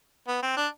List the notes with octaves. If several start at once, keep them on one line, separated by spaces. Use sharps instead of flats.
B3
C4
D4